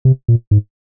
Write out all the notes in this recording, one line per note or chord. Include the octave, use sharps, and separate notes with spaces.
C3
A#2
G#2